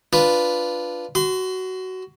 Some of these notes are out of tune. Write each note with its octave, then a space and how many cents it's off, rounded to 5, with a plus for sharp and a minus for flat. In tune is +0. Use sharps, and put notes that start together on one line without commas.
D4 +0 F4 +0 B4 +0
F#4 +15 C6 -30